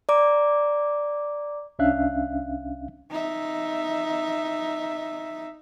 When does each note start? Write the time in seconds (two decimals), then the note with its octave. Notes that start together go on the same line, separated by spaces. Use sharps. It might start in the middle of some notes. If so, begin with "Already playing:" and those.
0.09 D5 A#5 D6
1.79 C2 C#4 D4 E5 F5 F#6
3.10 D#4 E5